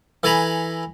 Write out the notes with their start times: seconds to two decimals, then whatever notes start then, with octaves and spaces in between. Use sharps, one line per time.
0.23 E3 A4 G#5 A#5 B5